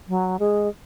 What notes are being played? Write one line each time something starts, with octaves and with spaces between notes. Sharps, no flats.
F#3
G#3